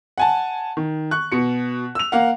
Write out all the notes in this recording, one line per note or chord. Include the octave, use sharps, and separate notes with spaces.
F#5 G#5 A5
D#3
C#6 F#6
B2 C#7
E6 F7
A#3 F5 F#5